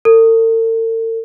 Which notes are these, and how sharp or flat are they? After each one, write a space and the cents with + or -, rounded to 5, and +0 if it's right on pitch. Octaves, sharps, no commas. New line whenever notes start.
A4 +45